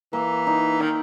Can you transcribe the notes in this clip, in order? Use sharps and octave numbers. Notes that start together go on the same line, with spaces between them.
E3 A#3
D#4
D#3 D#4